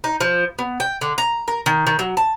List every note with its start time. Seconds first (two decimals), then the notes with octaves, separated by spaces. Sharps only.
0.04 D#4
0.21 F3
0.59 B3
0.80 G5
1.01 D3
1.18 A#5
1.48 A#4
1.66 D#3
1.87 D#3
1.99 F#3
2.17 A5